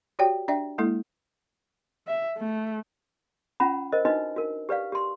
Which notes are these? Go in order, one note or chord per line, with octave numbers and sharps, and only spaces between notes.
F#4 G4 C#5 D5 G5
D4 D5 E5 G5
G#3 A#3 E4 A4
E5
A3
C#4 F4 F#5 A#5 B5
A#4 C5 D#5
D4 D#4 F#4 B4 D#5
F#4 A#4
G4 B4 D5 F5
G4 C6